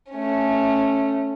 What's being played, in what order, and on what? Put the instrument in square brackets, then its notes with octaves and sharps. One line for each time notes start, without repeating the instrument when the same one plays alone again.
[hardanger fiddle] A3 C#4